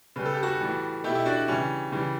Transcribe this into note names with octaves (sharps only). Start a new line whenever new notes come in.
C#3 G3 B4
A4
G4
F#4 A4
A2 E3 G3
B2 A3 E4 G4
E4
D4 F#4
C#3 E3 G3 C#4
C#3 E3 G3